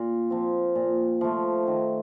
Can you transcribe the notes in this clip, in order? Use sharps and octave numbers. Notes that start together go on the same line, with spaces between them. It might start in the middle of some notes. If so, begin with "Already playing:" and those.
Already playing: A#2
F3 C4
A#2
F3 A3
D#3